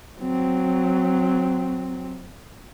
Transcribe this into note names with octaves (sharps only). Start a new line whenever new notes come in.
F#3 C4